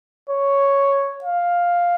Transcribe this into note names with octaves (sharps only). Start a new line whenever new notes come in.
C#5
F5